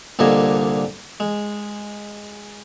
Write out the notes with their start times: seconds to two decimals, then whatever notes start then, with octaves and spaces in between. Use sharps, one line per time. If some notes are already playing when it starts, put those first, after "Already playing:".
0.19 C2 A#2 D3 D#5 G#5
1.20 G#3